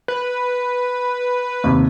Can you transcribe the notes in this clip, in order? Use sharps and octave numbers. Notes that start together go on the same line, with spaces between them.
B4
D#2 C3